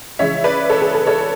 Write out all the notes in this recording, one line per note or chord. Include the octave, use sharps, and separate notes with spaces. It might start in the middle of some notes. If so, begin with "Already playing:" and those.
C#2 C#3 E3 G#3 C#5 E5
B4 D5
A4 C#5
G#4 B4
A4
A4 C#5